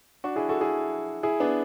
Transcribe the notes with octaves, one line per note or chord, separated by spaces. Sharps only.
D4 F#4
E4 G#4
F#4 A4
E4 G#4
E4 G#4
B3 D4